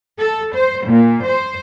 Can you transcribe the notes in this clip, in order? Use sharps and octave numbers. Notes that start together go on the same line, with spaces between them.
A4
C5
A#2
C5